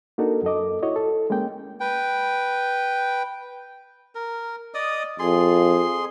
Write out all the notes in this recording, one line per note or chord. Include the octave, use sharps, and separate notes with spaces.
A#3 D4 D#4 F#4 A4 A#4
F#2 A4 D#5 D6
E4 F#4 C#5 D#5
A4
G#3 A#3 C#4 G5
B4 G5
A#4
D5 D#5 D#6
F2 G#4 C6